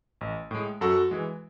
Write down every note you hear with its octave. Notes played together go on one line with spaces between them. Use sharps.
A1
A2 G#3
F#2 F#4 A4
E3 G#3